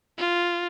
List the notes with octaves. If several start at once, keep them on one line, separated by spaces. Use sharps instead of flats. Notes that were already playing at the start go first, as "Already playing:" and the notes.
F4